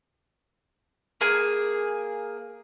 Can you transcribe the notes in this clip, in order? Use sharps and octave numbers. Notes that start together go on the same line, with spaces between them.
A#3 G#4